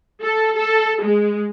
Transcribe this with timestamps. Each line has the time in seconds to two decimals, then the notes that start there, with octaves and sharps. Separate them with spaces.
0.22 A4
0.57 A4
1.02 G#3